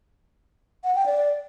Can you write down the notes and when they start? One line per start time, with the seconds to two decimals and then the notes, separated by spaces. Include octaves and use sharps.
0.84 F#5
0.95 G5
1.06 D5